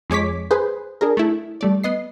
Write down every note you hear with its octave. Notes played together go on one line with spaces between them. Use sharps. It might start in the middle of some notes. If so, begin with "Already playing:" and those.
F2 G#3 C#5 D6 B6
G#4 B4 C5
D4 G#4 A#4
A3 E4
G3 A3 D5
B3 D#5 C7